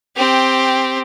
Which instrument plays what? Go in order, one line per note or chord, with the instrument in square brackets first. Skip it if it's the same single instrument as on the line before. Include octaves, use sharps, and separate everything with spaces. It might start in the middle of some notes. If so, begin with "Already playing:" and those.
[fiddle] C4 G4